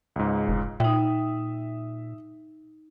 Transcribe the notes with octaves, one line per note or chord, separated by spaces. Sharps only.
C#2 G#2
F1
A#2 D#4 E5 G5 D#6